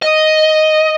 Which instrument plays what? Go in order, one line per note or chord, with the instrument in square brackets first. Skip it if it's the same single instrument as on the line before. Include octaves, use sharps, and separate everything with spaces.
[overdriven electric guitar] D#5